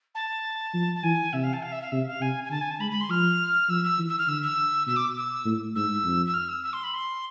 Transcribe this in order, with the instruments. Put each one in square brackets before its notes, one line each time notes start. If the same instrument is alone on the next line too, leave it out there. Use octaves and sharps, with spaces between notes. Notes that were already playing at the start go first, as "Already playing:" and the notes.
[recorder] A5
[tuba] F3
[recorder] A5
[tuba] E3 [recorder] G#5
[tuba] C3 [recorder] E5
[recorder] F5
A5
F5
E5
F5
[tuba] C3 [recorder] E5
[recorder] F5
[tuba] C3 [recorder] G#5
[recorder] G#5
[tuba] D3 [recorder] A5
[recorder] G#5
A5
[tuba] G#3 [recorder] B5
[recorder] B5
C6
[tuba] F3 [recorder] F6
[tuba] F3 [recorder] E6
[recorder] E6
[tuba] E3
[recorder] E6
F6
[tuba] D3 [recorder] E6
[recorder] E6
[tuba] B2 [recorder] E6
[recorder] D6
E6
[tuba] A2
[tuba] G#2 [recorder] E6
[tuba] F2
[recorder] E6
F6
E6
E6
C6
B5
C6